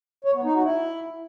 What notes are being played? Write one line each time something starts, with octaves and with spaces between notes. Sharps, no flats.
C#5
B3
D#4
F#4
E4